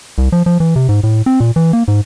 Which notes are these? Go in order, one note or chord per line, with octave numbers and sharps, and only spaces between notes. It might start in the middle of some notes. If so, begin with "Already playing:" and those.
C2
F3
F3
E3
C3
G#2
A2
C4
A#2
E3
A#3
G#2